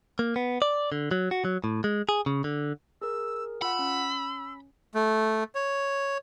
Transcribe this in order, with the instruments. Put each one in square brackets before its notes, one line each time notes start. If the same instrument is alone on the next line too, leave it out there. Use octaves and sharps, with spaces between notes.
[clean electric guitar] A#3
B3
D5
D3
F#3
F#4
F#3
A2
G#3
G#4
C#3
D3
[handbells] G#4 A#4 [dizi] E6
[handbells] F4 F#5 [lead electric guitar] B5 [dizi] E6
[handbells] C#4
[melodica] A3
C#5